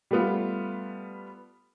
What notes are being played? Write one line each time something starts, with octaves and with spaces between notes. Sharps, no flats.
G3 A3 B3 F4